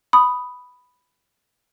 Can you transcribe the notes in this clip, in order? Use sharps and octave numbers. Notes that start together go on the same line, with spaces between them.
B5 D#6